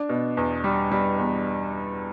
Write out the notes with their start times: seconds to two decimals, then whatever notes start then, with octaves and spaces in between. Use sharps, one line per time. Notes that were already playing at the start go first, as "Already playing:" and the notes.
Already playing: D4
0.09 B2
0.37 E2
0.64 G3
0.92 G3
1.18 E2